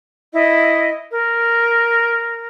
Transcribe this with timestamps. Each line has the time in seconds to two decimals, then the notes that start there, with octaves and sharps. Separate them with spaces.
0.33 E4 D#5
1.10 A#4